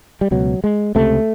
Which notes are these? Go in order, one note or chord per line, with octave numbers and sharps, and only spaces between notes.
G3
C#2 B2 F#3
G#3
C#2 C3 A3